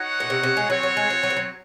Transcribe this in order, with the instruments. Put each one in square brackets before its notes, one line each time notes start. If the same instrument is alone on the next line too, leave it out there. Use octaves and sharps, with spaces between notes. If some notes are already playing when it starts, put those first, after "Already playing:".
Already playing: [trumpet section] D#4 F#4 C#5 F#5
[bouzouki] A#2
C3
C3
G#3
[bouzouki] F#3 [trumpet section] C4 F#4 C#5
[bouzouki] F#3
G#3
F3
F#3
F3
F#3